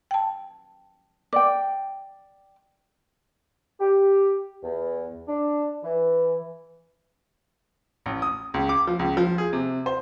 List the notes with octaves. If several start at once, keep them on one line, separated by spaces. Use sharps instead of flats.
G5 A5
D5 G5 D6
G4
E2
D4
E3
A1
D#6
C#2
D6
F3
C#2
F3
G#4
C3
C5